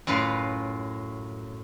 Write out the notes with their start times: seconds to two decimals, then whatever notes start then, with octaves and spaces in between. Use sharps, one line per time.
0.07 F#2 A2 F4 B4 F5